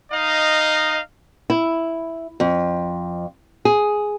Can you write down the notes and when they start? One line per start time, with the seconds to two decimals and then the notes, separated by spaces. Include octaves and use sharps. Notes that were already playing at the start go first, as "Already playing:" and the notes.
0.12 D#4 D#5 F5
1.50 E4
2.40 F2
3.65 G#4